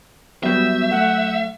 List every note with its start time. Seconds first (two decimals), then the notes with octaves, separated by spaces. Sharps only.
0.43 F#3 G3 B3 F#4 E5 G6
0.91 A3 F#5